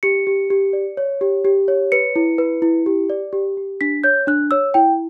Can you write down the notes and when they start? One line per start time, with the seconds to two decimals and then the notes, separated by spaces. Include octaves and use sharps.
0.03 G4 C#7
0.27 G4
0.50 G4
0.73 D5
0.97 C#5
1.21 G4
1.45 G4
1.68 C#5
1.92 B4 C#7
2.16 E4
2.38 B4
2.62 E4
2.86 G4
3.10 D5
3.33 G4
3.57 G4
3.81 D4 B6
4.04 C#5 G6
4.27 D4 F#6
4.51 C#5 E6
4.74 E4 G5